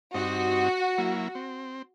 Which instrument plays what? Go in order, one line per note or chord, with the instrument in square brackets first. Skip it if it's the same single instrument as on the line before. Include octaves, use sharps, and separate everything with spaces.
[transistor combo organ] G2 C4 D#4 [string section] F#4
[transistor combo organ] F#3 A#3 E4
C4